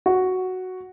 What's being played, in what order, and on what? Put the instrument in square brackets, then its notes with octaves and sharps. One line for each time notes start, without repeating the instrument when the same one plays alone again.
[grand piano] F#4